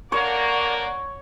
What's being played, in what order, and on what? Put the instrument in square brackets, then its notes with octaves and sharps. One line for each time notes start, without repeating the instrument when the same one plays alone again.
[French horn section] D3 A#3 A#4 [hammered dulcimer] C#5 [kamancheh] D5 F#5